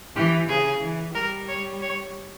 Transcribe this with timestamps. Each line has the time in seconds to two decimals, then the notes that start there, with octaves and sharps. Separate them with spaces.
0.16 E3 G4
0.49 C#3 G#4
0.82 E3
1.15 G3 A#4
1.49 C#5
1.82 C#5